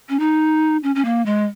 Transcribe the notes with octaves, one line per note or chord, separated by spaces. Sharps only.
C#4
D#4
C#4
C#4
A#3
G#3